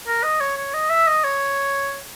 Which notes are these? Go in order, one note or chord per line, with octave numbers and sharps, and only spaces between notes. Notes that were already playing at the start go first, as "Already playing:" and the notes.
A#4
D#5
C#5
C#5
D#5
E5
D#5
C#5